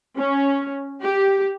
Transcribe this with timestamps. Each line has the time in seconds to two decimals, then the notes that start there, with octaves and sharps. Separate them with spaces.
0.16 C#4
1.03 G4